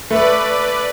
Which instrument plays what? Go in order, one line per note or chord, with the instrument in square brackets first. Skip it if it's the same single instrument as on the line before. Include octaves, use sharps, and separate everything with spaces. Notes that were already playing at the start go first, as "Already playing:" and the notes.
[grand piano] A3 [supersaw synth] B4 D5